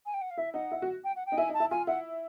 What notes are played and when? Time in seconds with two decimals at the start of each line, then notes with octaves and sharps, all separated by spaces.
0.06 G#5
0.14 G5
0.21 F#5
0.30 F5
0.37 E4 E5
0.54 D#4 F#5
0.71 E4
0.82 F#4
1.04 G5
1.16 F#5
1.26 G5
1.32 D#4
1.37 E4 G#5
1.49 D#4 A5
1.60 E4
1.71 F4 G#5
1.87 E4 F#5